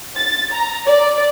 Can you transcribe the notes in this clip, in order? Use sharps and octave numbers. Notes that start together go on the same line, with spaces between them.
A6
A#5
D5